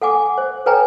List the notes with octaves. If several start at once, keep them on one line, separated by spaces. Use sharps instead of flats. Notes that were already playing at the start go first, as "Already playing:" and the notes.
A4 F#5 G#5 D6
C5
A4 B4 C#5 G5 G#5 A#5